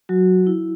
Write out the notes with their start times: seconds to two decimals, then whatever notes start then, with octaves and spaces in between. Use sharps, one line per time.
0.09 F#3 F#4
0.47 E4